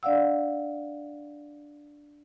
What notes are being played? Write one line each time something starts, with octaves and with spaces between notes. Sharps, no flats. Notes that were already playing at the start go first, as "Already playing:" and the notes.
D4 D5 F5 F#5 E6